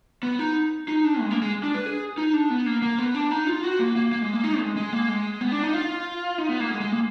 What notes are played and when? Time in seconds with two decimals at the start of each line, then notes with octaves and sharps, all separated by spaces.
0.23 B3
0.39 D#4
0.88 D#4
1.04 D4
1.21 G#3
1.31 A#3
1.42 G#3
1.63 D4
1.74 B4
1.86 G#4
2.18 D#4
2.33 D4
2.50 B3
2.66 A#3
2.82 A#3
2.99 B3
3.15 D4
3.31 D#4
3.47 F4
3.64 F#4
3.79 A#3
3.96 A#3
4.12 A#3
4.22 G#3
4.33 A#3
4.44 D#4
4.60 G#3
4.76 G#3
4.93 A#3
5.09 G#3
5.41 B3
5.52 D4
5.63 D#4
5.74 F4
6.38 D#4
6.49 B3
6.60 A#3
6.71 G#3
6.81 G#3
6.92 A#3